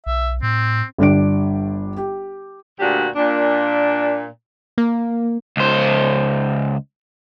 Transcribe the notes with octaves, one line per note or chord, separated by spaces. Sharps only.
B1 E5
A2 C4
G1 G3 D4 D7
G4
D2 A#2 D4 F#4 G4
A#2 D4
A#3
C#2 C5